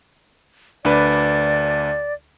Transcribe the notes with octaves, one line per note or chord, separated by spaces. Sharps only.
D2 D4 B4 D5